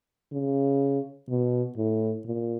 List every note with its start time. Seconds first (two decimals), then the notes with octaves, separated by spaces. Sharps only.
0.32 C#3
1.29 B2
1.77 A2
2.26 A#2